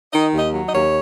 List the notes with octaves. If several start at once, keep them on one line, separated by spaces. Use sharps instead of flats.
D#3 D#5
D#2 D#5
F#3
D#5
D#2 C#5